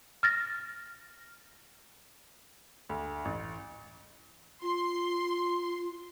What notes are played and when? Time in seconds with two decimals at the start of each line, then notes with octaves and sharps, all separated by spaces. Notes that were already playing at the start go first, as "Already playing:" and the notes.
0.23 F6 A6 A#6
2.89 D2
3.25 A1
4.62 F4 C6